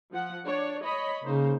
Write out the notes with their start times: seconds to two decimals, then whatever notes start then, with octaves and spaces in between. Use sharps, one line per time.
0.12 F3 F#5
0.46 D4 C#5 D5
0.84 C#5 D#5 B5
1.24 C#3 A#3 D#4 C5